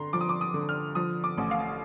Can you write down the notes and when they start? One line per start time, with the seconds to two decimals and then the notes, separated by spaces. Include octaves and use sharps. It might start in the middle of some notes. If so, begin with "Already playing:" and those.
Already playing: D3 A#5 C6
0.13 F3 D6
0.21 D#6
0.29 D6
0.41 D#6
0.54 D3
0.69 F6
0.95 F3 D#6
1.24 D6
1.38 A1
1.51 F5